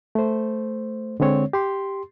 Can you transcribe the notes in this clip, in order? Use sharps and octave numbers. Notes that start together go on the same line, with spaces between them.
A3 C5
D3 G#3 C4 C#5
G4 C6